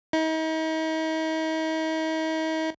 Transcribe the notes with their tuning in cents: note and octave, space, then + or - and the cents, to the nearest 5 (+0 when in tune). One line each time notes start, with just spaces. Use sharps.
D#4 +40